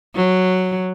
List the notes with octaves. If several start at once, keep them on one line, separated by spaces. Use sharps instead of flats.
F#3